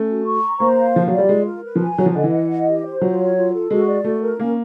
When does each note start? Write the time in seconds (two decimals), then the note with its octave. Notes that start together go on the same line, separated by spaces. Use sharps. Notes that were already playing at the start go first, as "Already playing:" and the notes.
Already playing: A3 C#4
0.08 F#4
0.25 C#6
0.43 A#5
0.60 A#3 C5
0.77 F5
0.95 F3 F4
1.07 F#3 D5
1.18 G3
1.29 G#3 F4
1.46 A#4
1.64 B4
1.76 F3
1.81 G#5
1.98 F#3 B4
2.06 F3
2.15 D3 D#5
2.24 E3
2.32 F#5
2.50 D#5
2.67 G4
2.85 C5
3.01 F#3 F4
3.18 C#5
3.36 F4
3.53 A4
3.70 G#3 F#4
3.87 D5
4.04 A3 F#4
4.22 A#4
4.39 A#3 C#4